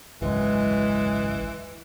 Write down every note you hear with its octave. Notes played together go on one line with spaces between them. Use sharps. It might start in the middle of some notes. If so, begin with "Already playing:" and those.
G#1 C#2 F#2 E3 G#3